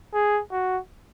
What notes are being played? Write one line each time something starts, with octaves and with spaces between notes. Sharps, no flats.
G#4
F#4